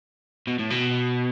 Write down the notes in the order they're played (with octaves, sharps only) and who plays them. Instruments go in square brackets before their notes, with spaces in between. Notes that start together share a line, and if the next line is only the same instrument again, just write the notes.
[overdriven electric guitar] B2
A2
B2